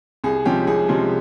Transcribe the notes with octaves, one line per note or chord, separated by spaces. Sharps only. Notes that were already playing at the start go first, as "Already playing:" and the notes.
C2 G#4
C3 F3 G#3 C#4 G4
C2 G#4
C3 F3 G#3 C#4